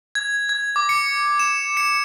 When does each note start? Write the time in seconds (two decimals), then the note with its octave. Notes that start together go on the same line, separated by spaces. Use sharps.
0.15 G#6
0.49 G#6
0.76 D6
0.89 C#7
1.39 E7
1.77 C#7